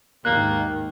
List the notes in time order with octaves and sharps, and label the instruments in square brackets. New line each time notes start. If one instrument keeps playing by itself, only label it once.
[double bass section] D#2 G#2 D#3 [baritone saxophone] A#3 [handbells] F#6